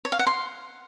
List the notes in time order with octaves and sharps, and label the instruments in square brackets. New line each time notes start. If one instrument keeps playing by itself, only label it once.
[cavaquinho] C#5
F5
F#5
C6